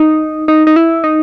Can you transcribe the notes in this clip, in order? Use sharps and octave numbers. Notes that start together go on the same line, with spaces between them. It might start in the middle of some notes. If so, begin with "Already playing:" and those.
Already playing: D#4
D#4
D#4
E4
D#4